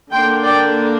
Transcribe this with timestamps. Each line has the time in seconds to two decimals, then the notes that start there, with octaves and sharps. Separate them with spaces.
0.13 D3 A#3 D4 G5 C6
0.45 D5 G5